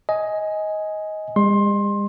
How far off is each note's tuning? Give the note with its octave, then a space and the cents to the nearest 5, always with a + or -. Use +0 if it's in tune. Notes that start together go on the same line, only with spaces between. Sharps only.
D#5 +15 G#5 +0
G#3 -45 C6 +20